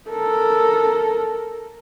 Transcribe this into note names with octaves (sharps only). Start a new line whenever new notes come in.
A4 A#4